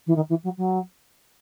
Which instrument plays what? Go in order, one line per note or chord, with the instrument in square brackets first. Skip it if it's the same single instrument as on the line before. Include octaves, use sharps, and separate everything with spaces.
[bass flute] E3
D#3
E3
F#3
F#3